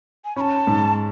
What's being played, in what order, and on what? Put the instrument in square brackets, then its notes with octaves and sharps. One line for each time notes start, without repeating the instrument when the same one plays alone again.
[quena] G#5
[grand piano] C#4 [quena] B5
[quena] A5
[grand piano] G#2